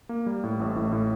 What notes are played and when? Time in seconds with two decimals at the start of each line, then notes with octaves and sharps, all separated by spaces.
0.09 A#3
0.26 G3
0.44 A2
0.60 A1
0.76 A2
0.93 A2